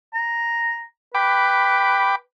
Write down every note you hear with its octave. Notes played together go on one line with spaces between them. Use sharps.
A#5
B4 G5 B5 D6